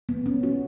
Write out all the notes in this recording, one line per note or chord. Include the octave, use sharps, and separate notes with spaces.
B3
C#4
F#4